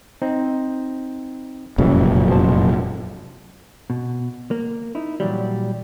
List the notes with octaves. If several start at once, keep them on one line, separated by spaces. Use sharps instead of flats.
C4 D#4
F1 F#2 A#2 C#3 E3
B2 C5 A5
B2
A#3
D#4 E4
A#2 E3 F#3 G3